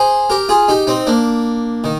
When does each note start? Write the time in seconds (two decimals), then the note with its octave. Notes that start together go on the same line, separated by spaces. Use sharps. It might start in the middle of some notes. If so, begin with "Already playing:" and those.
Already playing: G#4 C5
0.30 G4 A#4
0.49 F4 G#4
0.68 D#4 G4
0.87 C4 D#4
1.07 A#3 D4
1.84 D#3